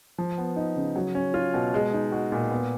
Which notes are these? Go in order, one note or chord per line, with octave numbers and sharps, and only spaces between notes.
F3
B3
D#4
C#3
F#3
C#4
F4
B2
G#3
D#4
F#4
A#2
B3